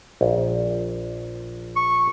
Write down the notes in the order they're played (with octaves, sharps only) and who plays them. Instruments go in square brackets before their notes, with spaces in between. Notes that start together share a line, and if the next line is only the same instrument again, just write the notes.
[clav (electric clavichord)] A#1
[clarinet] C#6